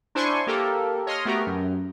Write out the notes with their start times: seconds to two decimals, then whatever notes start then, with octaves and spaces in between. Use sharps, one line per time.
0.15 D4 E4 C5 G#5 C6 C#6
0.47 A#3 G4 A4 A#4
1.07 C#5 D#5 C6 D#6 F6
1.25 A3 B3 F#4 G4 A#4
1.47 F#2